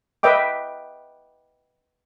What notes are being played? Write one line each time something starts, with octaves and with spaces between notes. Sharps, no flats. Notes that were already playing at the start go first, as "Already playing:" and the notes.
B4 D#5 E5 G5 D6